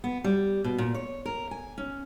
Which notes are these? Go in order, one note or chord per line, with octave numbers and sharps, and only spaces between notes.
B3
G3
B2
A#2
C#5
A#4
G#5
C#4